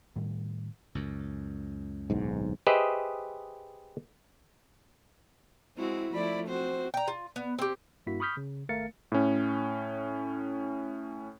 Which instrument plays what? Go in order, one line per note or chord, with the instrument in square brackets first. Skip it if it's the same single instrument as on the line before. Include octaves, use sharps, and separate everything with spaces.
[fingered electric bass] A2 D#3 G3
[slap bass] C#2 F#2
[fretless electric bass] D1 B1 G#2
[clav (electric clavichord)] G4 G#4 B4 C5 D#5 E5
[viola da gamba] G#3 C4 F#4 [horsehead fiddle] E4
[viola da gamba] F3 A3 E4 [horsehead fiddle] D5 B5
[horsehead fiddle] C4 F#4 [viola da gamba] C5
[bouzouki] G5 A#5
F4
B3
C4 G4
[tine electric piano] G2 A#3 E4 F#4 B6
B5 C#6 D#6 F6 G6 B6
C#3
G#1 A3 A#4 F5 A6 C#7
[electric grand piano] A2 C#4